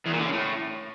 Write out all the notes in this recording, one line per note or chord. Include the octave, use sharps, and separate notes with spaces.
E2
A#2
D3
C#3
A2